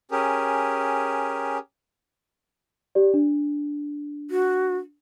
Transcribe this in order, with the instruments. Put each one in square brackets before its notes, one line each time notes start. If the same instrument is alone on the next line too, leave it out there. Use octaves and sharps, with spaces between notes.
[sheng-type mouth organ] C#4 G4 G#4 A#4
[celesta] G4 D5
D4
[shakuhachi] F#4